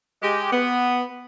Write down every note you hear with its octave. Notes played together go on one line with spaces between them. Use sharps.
G#3 G4
B3